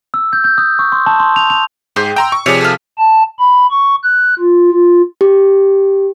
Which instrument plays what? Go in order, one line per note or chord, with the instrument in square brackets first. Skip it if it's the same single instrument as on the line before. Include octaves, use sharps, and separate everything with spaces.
[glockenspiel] E6
G6
G6
D#6
C#6
C6
A5
C6
F7
F7
[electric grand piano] G#2 [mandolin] G4 G#4 C5
[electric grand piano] G5 A#5 C6 [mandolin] E6
[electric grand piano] C#6
[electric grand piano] C3 F3 G#4 [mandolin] C#5 D5
[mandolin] A4 F5
[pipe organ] A5
B5
C#6
F#6
F4
F4
[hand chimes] G4